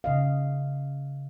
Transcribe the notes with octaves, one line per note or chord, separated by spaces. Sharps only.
C#3 D#5 F5